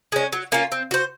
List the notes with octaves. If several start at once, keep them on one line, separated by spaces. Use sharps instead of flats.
G#3 C#4
F#3
A#3 C#4 F4
C4
F#4 C5